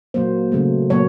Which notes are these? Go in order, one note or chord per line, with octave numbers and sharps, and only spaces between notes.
A#2 F#3 A#3 C5
C#3 F#3 A3
A#2 F#3 A#3 C#5